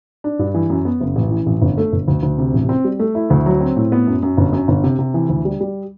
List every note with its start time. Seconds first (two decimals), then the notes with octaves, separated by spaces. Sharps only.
0.24 D4
0.39 G2
0.54 E3
0.70 F#2
0.85 B3
1.00 F#1
1.16 A1
1.31 E3
1.46 A1
1.61 G1
1.77 A3
1.92 G1
2.08 D2
2.23 D2
2.38 C3
2.53 A1
2.69 C4
2.85 G3
2.99 A3
3.15 E4
3.30 D2
3.46 F#3
3.61 C4
3.77 A2
3.92 B3
4.07 F#2
4.23 F#2
4.37 G1
4.53 F#2
4.68 G1
4.84 C3
4.99 C3
5.14 E3
5.29 D2
5.45 G3
5.61 G3